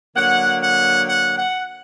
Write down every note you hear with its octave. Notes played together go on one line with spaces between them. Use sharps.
D3 F#3 A#3 F#5
F#5
F#5
F#5